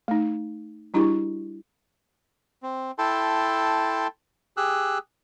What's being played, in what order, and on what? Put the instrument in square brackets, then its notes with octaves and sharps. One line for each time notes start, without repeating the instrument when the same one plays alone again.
[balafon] A3 D#4
G3 D4 E4 F#4 G4 C#6
[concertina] C4
E4 A4 G5 A5 C6
G4 G#4 E6 F#6